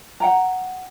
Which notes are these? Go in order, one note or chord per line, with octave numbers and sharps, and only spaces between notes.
F#5 G5 A#5